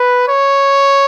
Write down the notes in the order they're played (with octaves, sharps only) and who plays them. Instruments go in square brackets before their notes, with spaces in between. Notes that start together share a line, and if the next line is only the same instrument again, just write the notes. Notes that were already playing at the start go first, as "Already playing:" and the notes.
Already playing: [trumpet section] B4
C#5